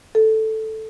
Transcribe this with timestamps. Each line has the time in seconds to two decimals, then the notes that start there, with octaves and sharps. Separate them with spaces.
0.15 A4